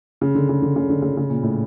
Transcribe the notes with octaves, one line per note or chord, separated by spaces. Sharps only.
C#3
D3
C#3
D3
C#3
D3
C#3
C#3
A#2
A2